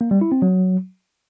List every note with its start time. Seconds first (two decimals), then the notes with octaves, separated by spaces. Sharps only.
0.01 A#3
0.11 G3
0.21 E4
0.32 C4
0.42 F#3